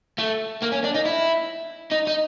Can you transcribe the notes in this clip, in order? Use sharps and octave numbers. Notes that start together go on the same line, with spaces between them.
A3
A#3
C#4
D4
D#4
E4
D#4
D#4